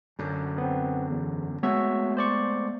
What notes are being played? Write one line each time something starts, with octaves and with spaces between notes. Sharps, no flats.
F#2 D3
B3 C4
E2
G#3 A3 B3 F#4 C#5 E5
C5 D5 C#6